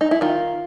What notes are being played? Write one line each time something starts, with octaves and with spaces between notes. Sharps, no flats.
D#4
E4
D#3 F4